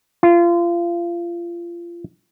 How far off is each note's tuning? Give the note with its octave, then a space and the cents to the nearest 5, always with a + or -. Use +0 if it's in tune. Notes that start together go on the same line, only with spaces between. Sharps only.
F4 -25